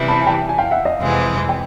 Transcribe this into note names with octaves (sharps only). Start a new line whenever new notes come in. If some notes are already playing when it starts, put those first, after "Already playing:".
Already playing: C3 E3 G3 B3 E4
A5 B5
G#5
G5 A5
G#5
F5 G5
E5 F#5
D#5 F5
F2 C3 E3 G#3 C4
G5